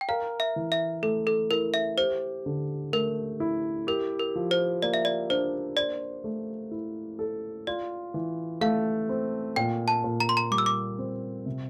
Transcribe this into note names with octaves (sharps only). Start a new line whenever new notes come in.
G5
A#4 F5
E5
E3
E5
A3 A4
A4
E4 A#4
E5
G4 C5
D3
A3 A#4
E4
G4 A#4
A#4
F3
C5
A#3 D5
E5
D5
D4 C5
C5 D5
A3
E4
A4
F4 D5
E3
A3 F5
C4
A#2 G5
A5
A#2
A#5
C6
A#5
G3 D6
E6
D6
C4
C3